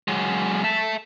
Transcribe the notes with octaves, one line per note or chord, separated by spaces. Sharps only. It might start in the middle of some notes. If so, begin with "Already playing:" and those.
F#3 G#3
E5 A5